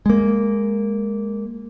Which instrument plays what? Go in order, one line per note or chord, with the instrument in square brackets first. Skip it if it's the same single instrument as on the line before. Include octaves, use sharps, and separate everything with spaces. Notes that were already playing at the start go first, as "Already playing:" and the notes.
[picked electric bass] G#3 A#3